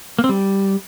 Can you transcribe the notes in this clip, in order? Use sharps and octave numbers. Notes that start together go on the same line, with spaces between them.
A#3
C4
G3